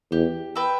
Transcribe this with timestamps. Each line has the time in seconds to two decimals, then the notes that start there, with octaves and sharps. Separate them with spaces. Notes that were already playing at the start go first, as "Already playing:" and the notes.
0.12 E2 G4
0.56 B4 E5 G5